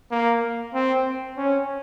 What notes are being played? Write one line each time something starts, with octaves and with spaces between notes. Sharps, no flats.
A#3
C4
C#4